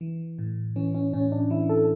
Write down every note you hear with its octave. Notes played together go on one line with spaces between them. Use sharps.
E3
A2
E3 C#4
C#4
A2 C#4
D4
E3 E4
A4